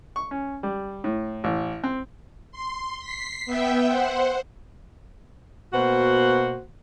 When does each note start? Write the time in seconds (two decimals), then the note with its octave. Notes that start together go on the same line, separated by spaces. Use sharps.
0.16 C#6
0.31 C#4
0.63 G3
1.04 A2
1.44 A1
1.84 C4
2.51 C6
3.00 B6 C7
3.46 B3 E5 G5
3.88 C5 F#5
5.73 B2 A#3 F#4 C5 F#5